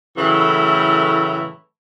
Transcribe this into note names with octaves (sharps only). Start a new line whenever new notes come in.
A2 C#3 E3 F#3 A3 E4